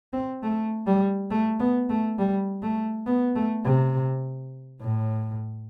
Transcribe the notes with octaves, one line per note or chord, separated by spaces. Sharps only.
C4
A3
G3
A3
B3
A3
G3
A3
B3
A3
C3
A2